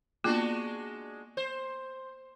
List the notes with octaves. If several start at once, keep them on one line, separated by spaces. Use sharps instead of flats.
G#3 A#3 B3 D4 F4 F#4
C5